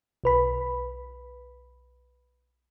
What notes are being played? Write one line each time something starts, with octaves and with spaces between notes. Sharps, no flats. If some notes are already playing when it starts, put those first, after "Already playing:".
B1 B4 B5